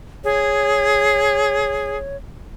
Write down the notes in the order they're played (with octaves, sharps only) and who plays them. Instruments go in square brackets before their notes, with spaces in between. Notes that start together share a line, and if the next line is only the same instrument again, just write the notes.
[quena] G#4 [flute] C#5